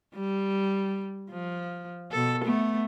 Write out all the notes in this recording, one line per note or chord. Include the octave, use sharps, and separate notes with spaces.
G3
F3
B2 A4
A3 B3